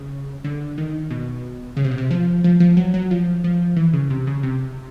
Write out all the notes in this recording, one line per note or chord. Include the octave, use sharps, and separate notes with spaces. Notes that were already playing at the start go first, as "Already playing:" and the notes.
Already playing: C#3
D3
D#3
B2
C#3
C3
B2
C3
F3
F3
F3
F#3
F#3
F3
F3
E3
C#3
C3
C#3
C3